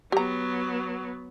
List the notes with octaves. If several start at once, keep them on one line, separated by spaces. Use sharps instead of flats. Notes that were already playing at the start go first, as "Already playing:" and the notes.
F#3 B3 G4 A#5